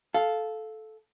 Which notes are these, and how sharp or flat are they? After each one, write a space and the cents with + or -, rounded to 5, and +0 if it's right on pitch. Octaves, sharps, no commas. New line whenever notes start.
A4 -10 F5 +0